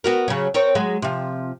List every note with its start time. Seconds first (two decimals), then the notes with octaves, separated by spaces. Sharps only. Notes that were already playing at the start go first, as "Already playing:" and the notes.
0.04 B3 F#4 A#4
0.28 C#3 F#3
0.54 C4 A#4 C#5
0.75 F#3 G#3
1.02 C3 F3